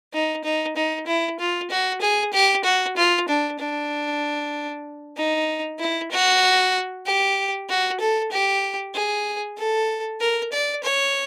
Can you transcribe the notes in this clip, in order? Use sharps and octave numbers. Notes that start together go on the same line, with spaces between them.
D#4
D#4
D#4
E4
F4
F#4
G#4
G4
F#4
F4
D4
D4
D#4
E4
F#4
G4
F#4
A4
G4
G#4
A4
A#4
D5
C#5